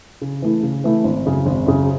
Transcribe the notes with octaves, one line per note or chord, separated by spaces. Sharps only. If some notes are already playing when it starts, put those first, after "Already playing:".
C#3
E3 A3 E4
C#3
E3 A3 E4
G#1
F#2 C#3
G#1
F#2 C#3